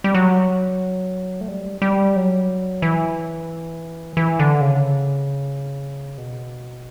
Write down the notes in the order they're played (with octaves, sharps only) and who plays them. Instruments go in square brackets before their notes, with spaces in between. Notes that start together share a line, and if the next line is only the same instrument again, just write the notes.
[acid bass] G3
F#3
A3
G3
G3
F#3
E3
E3
D3
C#3
B2